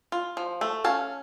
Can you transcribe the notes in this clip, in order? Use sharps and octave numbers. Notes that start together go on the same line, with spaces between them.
F4
F3
A3
C#4 F5 A5